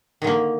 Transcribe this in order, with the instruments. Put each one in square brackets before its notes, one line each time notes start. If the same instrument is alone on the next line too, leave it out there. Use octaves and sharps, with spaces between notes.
[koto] D#3
D3
A#3